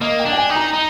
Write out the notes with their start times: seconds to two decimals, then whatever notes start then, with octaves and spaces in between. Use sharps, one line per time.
0.01 A#3 D#5
0.19 G5
0.25 D4
0.33 G5
0.38 G#5
0.50 D#4
0.55 A#5
0.73 D#4